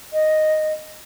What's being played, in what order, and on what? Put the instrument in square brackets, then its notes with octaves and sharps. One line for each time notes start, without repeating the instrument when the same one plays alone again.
[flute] D#5